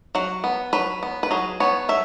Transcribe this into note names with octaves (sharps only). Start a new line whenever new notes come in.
F#3 F#5
B3
F#3 B4
B3
B4
F#3 G#4
B3 C#5
F#3 E5